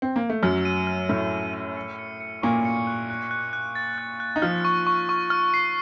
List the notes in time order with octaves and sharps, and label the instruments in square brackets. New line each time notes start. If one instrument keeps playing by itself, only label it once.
[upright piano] C4
A#3
A3
[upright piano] F#2 F#3 [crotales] F6
[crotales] D#7
F6
[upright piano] A2 A3 [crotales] F6
[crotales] F6
D#7
C#7
C#7
C#7
[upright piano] A#2 A#3 [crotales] C#6
[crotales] C#7
F#6
F#6
F#6
F#6
A6
F#6
F#6
[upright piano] D#4
[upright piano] F3 F4 [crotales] F6
[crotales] C#6
C#6
C#6
F6
C7